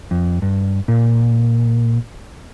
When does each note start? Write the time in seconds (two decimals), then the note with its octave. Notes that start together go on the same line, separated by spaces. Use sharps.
0.11 F2
0.42 G2
0.88 A#2